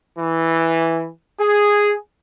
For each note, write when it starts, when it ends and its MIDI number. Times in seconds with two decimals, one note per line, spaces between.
0.19 1.08 52
1.40 1.93 68